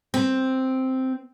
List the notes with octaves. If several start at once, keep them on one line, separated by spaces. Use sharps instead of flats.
C4